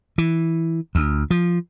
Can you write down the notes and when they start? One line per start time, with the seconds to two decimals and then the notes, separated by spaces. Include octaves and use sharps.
0.18 E3
0.95 D2
1.31 F3